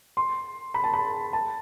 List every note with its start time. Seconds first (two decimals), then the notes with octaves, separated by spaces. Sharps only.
0.17 C6
0.74 B5
0.84 A5
0.94 B5
1.33 A5